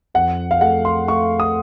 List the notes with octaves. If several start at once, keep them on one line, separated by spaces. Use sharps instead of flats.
F2 F#5
F5
A3 F#5
C6
A3 C#6
D#6